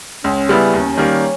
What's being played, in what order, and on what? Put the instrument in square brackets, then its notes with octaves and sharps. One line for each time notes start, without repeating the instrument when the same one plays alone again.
[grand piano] C#2 [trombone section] C#4
[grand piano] C#3 G3 B3 E4
D#2
D#3 G3 A#3